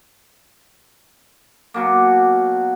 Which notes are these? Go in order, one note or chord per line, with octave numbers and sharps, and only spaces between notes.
B2 F#3 A#3